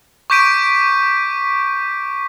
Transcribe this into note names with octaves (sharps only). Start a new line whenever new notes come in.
C#6 D6 G6 B6 D7 D#7